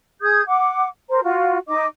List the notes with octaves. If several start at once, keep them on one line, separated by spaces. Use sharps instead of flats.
G#4 D#6 G6 G#6
F#5 D6
A#4 C5 A#5
F4 F#4
D#4 D#5 D6